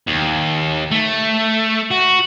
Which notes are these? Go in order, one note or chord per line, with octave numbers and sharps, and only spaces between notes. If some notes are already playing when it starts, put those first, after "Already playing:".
D#2
A3
F#4